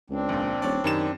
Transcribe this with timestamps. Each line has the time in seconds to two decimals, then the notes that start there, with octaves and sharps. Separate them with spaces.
0.10 C#2 C4 D4
0.29 A#1 A#2
0.62 D#1 C#5 D5
0.84 F#2 D#3 G4 E7